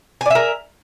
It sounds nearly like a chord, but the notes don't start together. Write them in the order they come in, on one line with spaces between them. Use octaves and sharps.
G#5 D5 E5 A#4